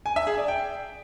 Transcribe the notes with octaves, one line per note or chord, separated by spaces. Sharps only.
G#5
E5
G#4
D5
G5